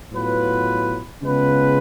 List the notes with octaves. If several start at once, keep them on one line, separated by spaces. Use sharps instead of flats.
A2 F#3 B3 F4 B4
C#3 G#3 B3 F4 B4